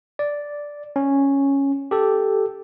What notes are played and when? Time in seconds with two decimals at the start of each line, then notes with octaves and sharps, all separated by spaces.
0.19 D5
0.96 C#4
1.91 G4 A4